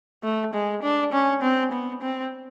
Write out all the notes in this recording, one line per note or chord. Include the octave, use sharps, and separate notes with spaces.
A3
G#3
D4
C#4
C4
B3
C4